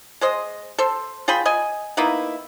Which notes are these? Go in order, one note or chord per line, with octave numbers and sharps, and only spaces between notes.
G#3 C5 D#5
A4 C5
F4 G#4 G5 B5
D#5 G#5
A#3 B3 D#4 E4